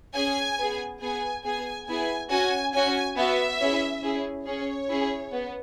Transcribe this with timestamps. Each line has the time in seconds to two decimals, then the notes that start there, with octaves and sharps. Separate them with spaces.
0.15 C#4 G#4 G#5
0.58 B3 G#4
1.01 B3 G#4 G#5
1.44 B3 G#4 G#5
1.87 B3 E4 G#4 G#5
2.30 C#4 F#4 G#5
2.73 C#4 F#4 G#5
3.17 B3 F#4 E5
3.60 C#4 E4 G#4
4.03 C#4 E4 G#4
4.46 C#4 G#4 C#5
4.89 C#4 E4 G#4
5.32 B3